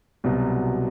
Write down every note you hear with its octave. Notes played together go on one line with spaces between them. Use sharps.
C2 B2 F#3